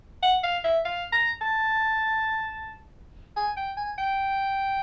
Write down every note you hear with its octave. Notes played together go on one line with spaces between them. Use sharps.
F#5
F5
E5
F5
A#5
A5
G#5
G5
G#5
G5